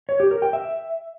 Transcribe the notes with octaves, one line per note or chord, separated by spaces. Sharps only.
C#5
G4
A#4
G5
E5